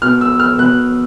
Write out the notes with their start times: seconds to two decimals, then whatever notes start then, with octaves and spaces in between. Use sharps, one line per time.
0.02 B2 F6
0.21 E6
0.40 F6
0.58 B2 F#6